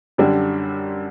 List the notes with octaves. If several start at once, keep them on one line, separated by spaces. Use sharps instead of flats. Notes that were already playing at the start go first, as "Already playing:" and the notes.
F#2 D3 G3 D4 G4